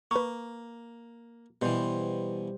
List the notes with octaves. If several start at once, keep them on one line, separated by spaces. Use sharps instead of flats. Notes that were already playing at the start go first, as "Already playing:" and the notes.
A#3 B4 C#6
B2 E3 G3 C5